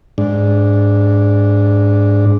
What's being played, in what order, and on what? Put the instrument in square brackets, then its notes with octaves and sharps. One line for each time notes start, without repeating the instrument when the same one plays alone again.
[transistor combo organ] G#2 D4